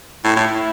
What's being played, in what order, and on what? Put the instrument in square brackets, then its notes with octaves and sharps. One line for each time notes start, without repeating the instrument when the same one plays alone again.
[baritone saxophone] A2 [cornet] E4
[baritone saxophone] A2